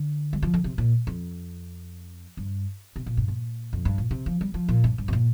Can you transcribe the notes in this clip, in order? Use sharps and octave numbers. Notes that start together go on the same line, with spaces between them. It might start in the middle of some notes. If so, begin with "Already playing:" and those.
Already playing: D3
G3
F3
D3
C3
A#2
F2
G2
C3
A#2
G2
A#2
F2
G2
A#2
C3
F3
G3
F3
A#2
G2
G2
C3
A#2